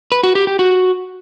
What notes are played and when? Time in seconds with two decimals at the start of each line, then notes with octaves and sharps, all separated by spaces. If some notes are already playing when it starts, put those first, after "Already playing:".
0.12 B4
0.23 F#4
0.35 G4
0.47 G4
0.59 F#4